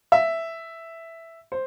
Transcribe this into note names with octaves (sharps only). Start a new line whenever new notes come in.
E5
C5